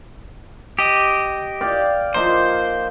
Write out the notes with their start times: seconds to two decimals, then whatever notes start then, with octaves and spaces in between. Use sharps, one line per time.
0.79 G4 D#5
1.61 D5 F5 G5
2.14 F3 A#3 D#4 C5